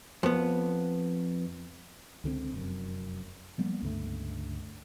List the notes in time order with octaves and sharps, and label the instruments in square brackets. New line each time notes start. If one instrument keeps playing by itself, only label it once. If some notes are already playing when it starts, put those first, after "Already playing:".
[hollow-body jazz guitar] F2 B3
[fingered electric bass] C#2 D3 E3 C4
F1 F#2
F3 G3 A#3 B3
C#2 G2 D3 A3